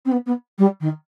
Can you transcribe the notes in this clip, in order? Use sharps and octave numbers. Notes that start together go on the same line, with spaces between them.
C4
B3
B3
G3
D#3